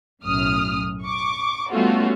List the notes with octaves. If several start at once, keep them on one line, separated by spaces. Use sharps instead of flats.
B1 F#2 A2 D#6 F6
C#6 D6
G3 A3 B3 C#4 F4 F#4